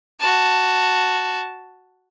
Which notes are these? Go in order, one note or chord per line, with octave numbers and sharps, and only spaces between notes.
F#4 A5